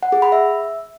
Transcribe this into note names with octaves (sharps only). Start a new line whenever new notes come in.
F#5
G#4
B5
E5